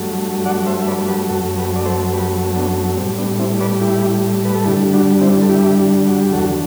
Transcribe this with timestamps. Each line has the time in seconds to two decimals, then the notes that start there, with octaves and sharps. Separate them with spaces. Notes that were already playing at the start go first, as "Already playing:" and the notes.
Already playing: G2 F#3 A3
0.45 D5 F#5
0.66 C5 E5
0.82 E5
0.87 B4 D5
1.08 G4 B4
1.29 F#2 F#3 A3 F#4 A4
1.58 G4 B4
1.76 D5
1.86 A4 C5
2.13 G4 B4
2.55 B3 D4
2.97 G3 A3 C4
3.01 A2
3.18 B3 D4
3.39 C4 E4
3.60 B4 D5
3.81 E4 G4
4.45 B4
4.55 A4
4.64 G2 D3 G3 E4 G4
4.93 D4 F#4
5.21 C4 E4
5.42 A4
5.49 E4 G4
6.08 F#4
6.20 G4
6.32 E2 D3 F#3 F#4 A4